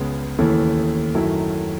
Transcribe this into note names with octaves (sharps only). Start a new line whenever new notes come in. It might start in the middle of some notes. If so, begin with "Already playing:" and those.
Already playing: C#2 C#3 G#3 B3
D#2 C#3 E3 A3 E4
F#2 D#3 F#3 A3 E4